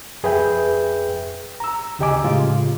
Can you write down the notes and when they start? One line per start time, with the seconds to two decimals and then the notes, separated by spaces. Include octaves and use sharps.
0.23 F2 G#4 B4 E5 G5 G6
1.60 A#5 E6
1.99 D2 C#3 G4 D#5 G#5 D6
2.24 A2 C#3 G#3 F4